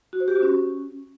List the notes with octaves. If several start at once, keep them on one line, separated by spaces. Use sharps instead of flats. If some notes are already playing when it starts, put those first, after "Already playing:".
F#4
C5
G4
F#4
C#4